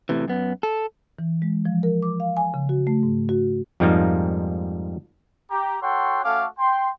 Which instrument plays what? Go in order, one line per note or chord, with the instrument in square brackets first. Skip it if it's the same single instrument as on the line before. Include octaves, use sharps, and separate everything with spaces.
[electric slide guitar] A2 C3 E3
F#2 B3
A4
[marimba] E3
G#3
F3
A#4
D6
F5
G#5
C#3
F#4
A3
G#2
F#4
[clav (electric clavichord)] F2 G#2 F3 G3 A#3 D#4
[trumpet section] G4 A#5
F#4 A4 C#5 F#5 G5 C6
A3 C#4 F#4 A4 F5 D6
G5 C6